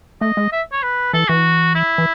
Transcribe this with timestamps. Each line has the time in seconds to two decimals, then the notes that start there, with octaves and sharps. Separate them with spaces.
0.21 A3 D#5
0.37 G#3
0.53 E5
0.72 C#5
0.83 B4
1.13 E3 A4
1.29 E3 F#4
1.75 E4
1.98 E3